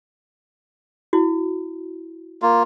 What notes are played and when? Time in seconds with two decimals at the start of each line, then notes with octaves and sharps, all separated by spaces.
1.13 E4 F#4
2.42 A#3 F4